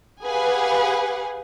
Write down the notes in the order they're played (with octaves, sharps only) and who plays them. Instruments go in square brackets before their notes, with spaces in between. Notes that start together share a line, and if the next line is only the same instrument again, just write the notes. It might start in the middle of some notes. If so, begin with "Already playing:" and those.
[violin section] G4 G#4 B4 F5 F#5 G#5